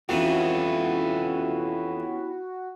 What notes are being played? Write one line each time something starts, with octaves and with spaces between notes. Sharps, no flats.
F2 E3 B3 C#4 E4 F#4 G4